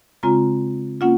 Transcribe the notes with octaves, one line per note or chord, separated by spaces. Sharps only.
C#3 G#3 C4 F4 A#5
A#3 C#4 F4 F#5